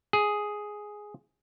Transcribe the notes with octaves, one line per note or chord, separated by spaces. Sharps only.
G#4